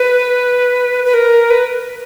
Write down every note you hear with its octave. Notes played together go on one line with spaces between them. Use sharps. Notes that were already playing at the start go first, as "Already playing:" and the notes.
Already playing: B4
B4
A#4
B4